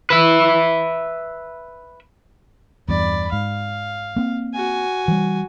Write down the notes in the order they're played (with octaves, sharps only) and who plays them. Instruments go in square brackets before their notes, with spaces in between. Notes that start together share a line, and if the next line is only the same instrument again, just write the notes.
[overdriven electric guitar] B4 E5
[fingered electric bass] E2 G2 [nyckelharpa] D5 B5
[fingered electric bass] G#2 [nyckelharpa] F5
[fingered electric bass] A#3 C4
[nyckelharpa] F#4 G#5
[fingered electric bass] E3 G3